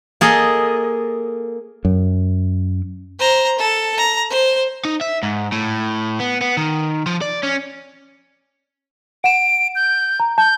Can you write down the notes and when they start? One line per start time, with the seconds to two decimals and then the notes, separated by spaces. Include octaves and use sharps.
0.21 A#3 G#4 A4 D#5
1.85 F#2
3.19 C5 A#5
3.59 A4
3.97 A#5
4.30 C5
4.85 D#4
5.01 E5
5.23 G#2
5.52 A2
6.20 B3
6.41 B3
6.57 D#3
7.06 F3
7.21 D5
7.43 C#4
9.24 F#5 D7 E7
9.75 G6
10.20 A#5
10.38 A5 G6